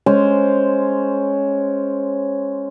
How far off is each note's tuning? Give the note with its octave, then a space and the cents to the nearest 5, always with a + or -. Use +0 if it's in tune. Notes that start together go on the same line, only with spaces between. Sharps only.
G#3 +0 C#4 +0 C5 +0